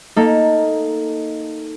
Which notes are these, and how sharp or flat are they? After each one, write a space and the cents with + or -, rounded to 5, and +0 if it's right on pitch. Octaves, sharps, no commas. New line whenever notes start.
A#3 +0 D#4 +10 A4 +10